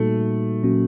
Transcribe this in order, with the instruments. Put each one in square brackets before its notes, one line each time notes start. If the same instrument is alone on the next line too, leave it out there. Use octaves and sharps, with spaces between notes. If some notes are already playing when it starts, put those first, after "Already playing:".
Already playing: [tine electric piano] A#2 G3 A#3 D#4 F#4 [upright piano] A3
[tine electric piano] A#2 F#3 A#3 C#4 F#4